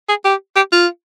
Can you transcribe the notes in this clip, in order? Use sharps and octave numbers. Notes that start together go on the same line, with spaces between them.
G#4
G4
G4
F4